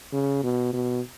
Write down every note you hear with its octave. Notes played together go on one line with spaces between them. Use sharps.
C#3
B2
B2